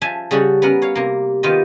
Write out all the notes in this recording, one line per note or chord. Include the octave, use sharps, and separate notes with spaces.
F3 E5 G#5 A5
C#3 G3 C#4 F#4 A4
B3 C#4 A#4 F#5
C#5 F5
C3 A#3
D#3 B3 F4 G4 D#5